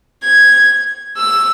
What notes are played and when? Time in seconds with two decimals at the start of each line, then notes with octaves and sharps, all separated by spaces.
0.24 G#6
1.18 E6